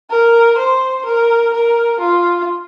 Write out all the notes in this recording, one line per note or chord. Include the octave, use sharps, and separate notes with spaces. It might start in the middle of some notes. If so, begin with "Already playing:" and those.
A#4
C5
A#4
A#4
F4